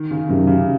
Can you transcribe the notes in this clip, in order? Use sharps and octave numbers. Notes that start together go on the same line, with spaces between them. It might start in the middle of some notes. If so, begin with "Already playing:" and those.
Already playing: D#3
C#3
F#2 C3
C#3